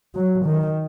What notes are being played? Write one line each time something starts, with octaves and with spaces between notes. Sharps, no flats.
F#3
D#3